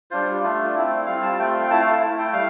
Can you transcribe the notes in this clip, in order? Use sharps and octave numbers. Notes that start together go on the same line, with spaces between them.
G3 D4 F4 C5
A3 D4 F4
A3 C4 E4
G3 C4 F4 F5
A5
A3 C4 F4 G5
A3 E4 A5
F5
A5
A3 E4 A5
G5
G3 F5